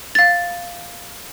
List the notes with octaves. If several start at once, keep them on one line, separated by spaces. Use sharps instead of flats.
F5 A6